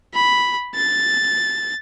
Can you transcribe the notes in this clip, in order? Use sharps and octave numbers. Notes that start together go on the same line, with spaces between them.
B5
A6